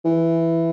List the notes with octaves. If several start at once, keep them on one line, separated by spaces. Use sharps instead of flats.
E3